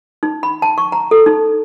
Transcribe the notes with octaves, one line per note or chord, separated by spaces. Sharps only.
D#4
B5
A5
C#6
A#5
A4
D#4